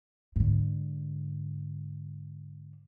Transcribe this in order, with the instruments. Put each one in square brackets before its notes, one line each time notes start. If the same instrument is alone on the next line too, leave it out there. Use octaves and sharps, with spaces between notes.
[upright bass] G#2 D3